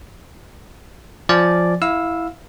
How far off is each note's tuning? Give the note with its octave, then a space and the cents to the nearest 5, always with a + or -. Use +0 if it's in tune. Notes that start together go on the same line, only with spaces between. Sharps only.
F3 +0 D5 +0 G#5 +0
E4 +0 F5 +20 E6 +0